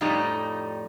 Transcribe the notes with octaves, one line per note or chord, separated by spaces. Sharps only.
F2 A2 G3 D#4